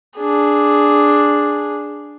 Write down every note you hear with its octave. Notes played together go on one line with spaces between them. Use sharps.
D4 G#4